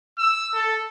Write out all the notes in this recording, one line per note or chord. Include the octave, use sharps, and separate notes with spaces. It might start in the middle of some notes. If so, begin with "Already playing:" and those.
E6
A4